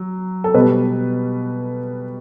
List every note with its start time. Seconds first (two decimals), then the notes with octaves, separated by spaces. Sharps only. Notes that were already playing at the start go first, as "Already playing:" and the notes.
Already playing: F#3
0.44 A4
0.54 B2 G3 B4